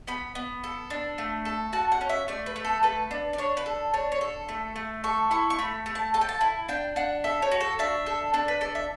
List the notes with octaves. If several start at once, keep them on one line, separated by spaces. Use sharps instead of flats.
B3 B5
B3
A4
D4
A3
A4
F#4 A5
F#5
C#4
E5
A3 D5
B4
A3
A4
A4 B4
D4
D5
D4 C#5
B4
A4
D4 C#5
C#5
A4
A3
A3
A4 C#6
E4 C#6
C#6
A3 B5
A3
A5
A4 A5
G5
A5
E4
D4 G5
D4 F#5
A4 E5
C#5
F#4
A4
D4 E5
A4
D4 A4
B4
A4 D5
E5